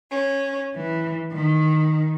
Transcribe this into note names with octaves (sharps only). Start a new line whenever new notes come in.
C#4
E3
D#3